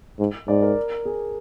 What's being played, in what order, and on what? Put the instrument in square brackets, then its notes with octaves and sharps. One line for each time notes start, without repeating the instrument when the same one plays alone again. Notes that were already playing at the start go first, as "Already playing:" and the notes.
[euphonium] G#2
[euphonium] G#2 [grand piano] D5
[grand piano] A#4
G#4